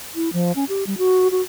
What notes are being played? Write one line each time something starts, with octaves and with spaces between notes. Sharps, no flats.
E4
F3
C#4
G4
G3
F#4
F#4